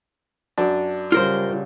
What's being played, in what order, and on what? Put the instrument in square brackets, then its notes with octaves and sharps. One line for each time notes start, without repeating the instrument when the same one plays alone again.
[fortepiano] F#2 D4
[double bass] C#3 G3 [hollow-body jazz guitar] F4 A#4 C5